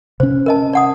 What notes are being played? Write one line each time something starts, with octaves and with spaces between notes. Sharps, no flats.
C3 C#4 C5
A#4 D#5 A5
D5 F#5 D#6